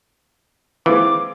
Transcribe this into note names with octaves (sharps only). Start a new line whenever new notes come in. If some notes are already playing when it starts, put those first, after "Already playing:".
E3 G#3 C4 F4 D6